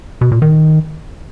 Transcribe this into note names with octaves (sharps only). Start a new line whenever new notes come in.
B2
A#2
D#3